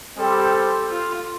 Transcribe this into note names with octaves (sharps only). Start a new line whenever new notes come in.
G3 C4 G4 A4 C5
F4